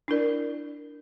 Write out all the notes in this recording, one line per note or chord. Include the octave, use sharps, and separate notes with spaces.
D4 E4 A#4 D5